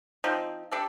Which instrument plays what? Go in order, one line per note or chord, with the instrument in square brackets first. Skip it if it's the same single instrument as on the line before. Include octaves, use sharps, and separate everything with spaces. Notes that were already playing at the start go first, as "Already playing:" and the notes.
[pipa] F3 C4 D#4
G3 D4 A4